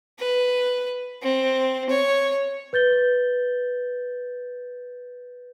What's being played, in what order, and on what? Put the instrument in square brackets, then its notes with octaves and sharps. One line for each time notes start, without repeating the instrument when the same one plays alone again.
[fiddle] B4
C4
C#5
[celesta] B4 G6 A6 G7